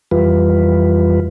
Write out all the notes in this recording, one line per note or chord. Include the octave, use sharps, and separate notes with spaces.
F2 E3 G3 F4 B4